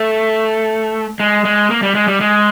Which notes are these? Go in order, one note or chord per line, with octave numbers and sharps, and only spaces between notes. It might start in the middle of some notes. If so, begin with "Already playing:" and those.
Already playing: A3
G#3
G#3
A#3
G3
G#3
G3
G#3